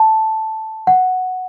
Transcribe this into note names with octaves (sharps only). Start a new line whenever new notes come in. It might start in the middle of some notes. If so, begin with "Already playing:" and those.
Already playing: A5
F#5